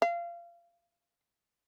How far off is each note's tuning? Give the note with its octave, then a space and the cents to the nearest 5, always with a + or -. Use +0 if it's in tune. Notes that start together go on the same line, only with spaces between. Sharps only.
F5 -25